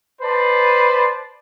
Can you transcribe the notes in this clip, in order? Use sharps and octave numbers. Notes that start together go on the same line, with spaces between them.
B4 C5 D5 A5